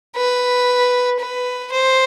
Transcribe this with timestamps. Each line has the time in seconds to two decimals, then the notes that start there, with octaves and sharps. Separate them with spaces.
0.16 B4
1.20 B4
1.72 C5